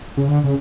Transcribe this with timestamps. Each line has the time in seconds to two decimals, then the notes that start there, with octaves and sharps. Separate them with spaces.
0.17 C#3
0.28 D3
0.44 C#3